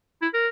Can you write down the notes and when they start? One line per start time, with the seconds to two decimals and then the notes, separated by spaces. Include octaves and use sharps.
0.22 E4
0.34 A#4